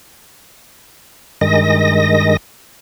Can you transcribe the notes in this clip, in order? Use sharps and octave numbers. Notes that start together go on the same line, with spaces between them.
G2 D#3 G#3 D#5 A#6